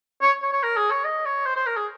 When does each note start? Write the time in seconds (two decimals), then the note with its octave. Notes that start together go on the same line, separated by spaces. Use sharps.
0.22 C#5
0.43 C#5
0.53 C#5
0.63 A#4
0.77 G#4
0.90 C#5
1.05 D#5
1.26 C#5
1.46 C5
1.56 C5
1.66 A#4
1.77 G#4